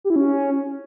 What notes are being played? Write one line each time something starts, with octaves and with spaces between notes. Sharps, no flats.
G4
E4
C#4